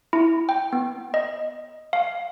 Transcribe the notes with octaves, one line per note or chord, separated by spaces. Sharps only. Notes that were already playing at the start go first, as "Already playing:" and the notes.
E4
G5
B3
D#5
F5